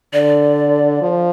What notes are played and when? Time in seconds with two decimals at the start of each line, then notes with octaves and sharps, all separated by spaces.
0.13 D3 D5
1.02 F3